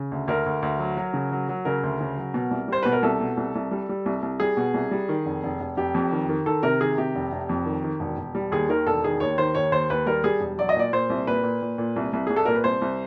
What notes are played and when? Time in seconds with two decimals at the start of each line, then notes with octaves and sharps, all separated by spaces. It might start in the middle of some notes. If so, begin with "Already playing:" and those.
Already playing: C#3
0.12 D2
0.28 D2 A#4
0.46 D2
0.62 D2
0.79 F#3
0.97 F#3
1.14 C#3
1.32 F#3
1.49 F#3
1.65 C#3 A#4
1.83 D2
2.01 C#3
2.17 F#3
2.34 B2
2.51 C2
2.68 G3 C5
2.83 B2 B4
2.92 A#4
3.03 C2 A4
3.20 B2
3.37 C2
3.55 C2
3.71 G3
3.89 G3
4.06 C2
4.22 C2
4.40 G3 G#4
4.57 B2
4.74 C2
4.91 G3
5.09 D#3
5.26 F1
5.44 F1
5.61 F1
5.77 F1 G4
5.94 F2
6.12 D#3
6.29 D#3
6.46 D#3 A4
6.63 C3 A#4
6.80 D#3 G#4
6.98 C3 G4
7.15 F1
7.32 F1
7.49 F2
7.66 D#3
7.84 D#3
8.00 E1
8.18 E1
8.35 G3
8.52 D#2 G#4
8.69 D#3 A#4
8.87 E1 A4
9.04 D#3 G#4
9.20 D#2 C#5
9.38 D#3 C5
9.55 D#2 C#5
9.72 D#2 C5
9.90 D#2 B4
10.06 G3 A#4
10.24 G3 G#4
10.40 E1
10.58 F#3 D5
10.69 D#5
10.76 A#2 D5
10.93 A#2 C5
11.10 C2
11.27 A#2 B4
11.43 A#2
11.62 A#2
11.78 A#2
11.96 C2
12.13 C2
12.27 C2 G#4
12.36 A4
12.45 A#2 A#4
12.55 B4
12.64 C2 C5
12.82 C2